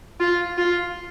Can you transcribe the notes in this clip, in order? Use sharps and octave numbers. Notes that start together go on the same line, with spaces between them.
F4
F4